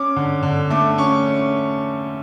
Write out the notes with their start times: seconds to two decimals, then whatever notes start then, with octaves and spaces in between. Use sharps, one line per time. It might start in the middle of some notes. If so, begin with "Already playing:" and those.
Already playing: C#4 D6
0.16 D3
0.43 D3
0.70 A3 D6
0.98 C#4 C#6